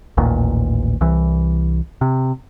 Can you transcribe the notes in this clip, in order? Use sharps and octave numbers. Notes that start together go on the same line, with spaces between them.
A1 D#2 A#2
C2 E3
C3